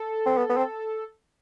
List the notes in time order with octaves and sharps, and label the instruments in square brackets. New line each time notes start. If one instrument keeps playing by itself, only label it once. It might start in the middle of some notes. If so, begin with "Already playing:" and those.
Already playing: [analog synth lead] A4
[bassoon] C4
B3
B3
C4